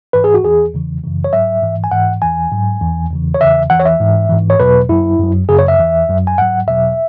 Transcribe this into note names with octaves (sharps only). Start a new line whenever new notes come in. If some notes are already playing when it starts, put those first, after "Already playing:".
G#2 E3 B4
G#4
F#4
E2 E3 G#4
E2 C#3 E3
F#2 C#3 E3
C#5
G#2 F#3 E5
G#2 E3
G#5
G#2 E3 F#5
E2 E3 G#5
G#2 F#3
E2 E3
E2 C#3 E3
C#5
E2 C#3 E3 E5
E2 E3 F#5
C#5
E5
G#2 E3
G#2 E3
C#5
E2 B2 F#3 B4
F#2 F#3 E4
F#2 F#3
F#2 C#3 F#3 G#4
C#5
E5
E2 E3
F#2 F#3
G#5
G#2 F#3 F#5
E2 B2 F#3 E5